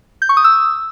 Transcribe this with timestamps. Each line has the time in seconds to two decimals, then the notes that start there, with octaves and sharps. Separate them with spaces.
0.22 G6
0.29 C#6
0.37 D#6
0.44 E6